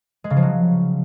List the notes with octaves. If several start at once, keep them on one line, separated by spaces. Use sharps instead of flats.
G#3
C#3
F3
F#3